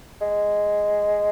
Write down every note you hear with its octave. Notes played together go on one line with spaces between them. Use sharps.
G#3